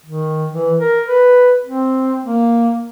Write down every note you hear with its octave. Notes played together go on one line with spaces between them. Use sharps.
D#3
E3
A#4
B4
C4
A#3